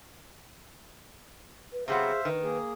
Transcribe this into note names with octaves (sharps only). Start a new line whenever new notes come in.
B4
C3 F#3 B3 G#4 C5 E5 F5
D#3 B4
A#3 G#4